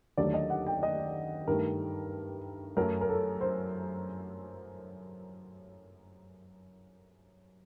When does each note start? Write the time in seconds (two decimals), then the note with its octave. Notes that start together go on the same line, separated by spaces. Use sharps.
0.17 D#2 D3 F#3 A3 D5
0.34 D#5
0.50 F#5
0.67 G5
0.83 D#5
1.47 G2 D#3 A3 A#4
2.77 F#2 F#3 A3 A#4
3.01 A#4
3.09 A4
3.41 C5